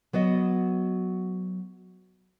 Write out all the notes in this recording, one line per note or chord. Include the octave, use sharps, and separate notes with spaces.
F#3 B3 F#4 D#5